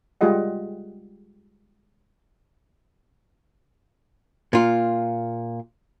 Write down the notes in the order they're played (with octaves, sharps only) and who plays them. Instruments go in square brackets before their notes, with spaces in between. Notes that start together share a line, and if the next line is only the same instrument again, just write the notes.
[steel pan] G3 G#3 F4 G4 D#5 F#5
[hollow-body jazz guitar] A#2 F4